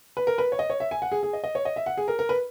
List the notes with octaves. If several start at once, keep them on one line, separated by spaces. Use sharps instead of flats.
B4
A#4
B4
C#5
D#5
C#5
E5
G#5
F#5
G#4
G#4
D#5
D#5
C#5
D#5
E5
F#5
G#4
A#4
A#4
B4